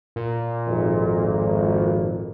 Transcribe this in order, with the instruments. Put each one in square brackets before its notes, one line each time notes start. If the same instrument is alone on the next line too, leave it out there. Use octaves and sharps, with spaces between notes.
[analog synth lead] A#2
[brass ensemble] G#1 F2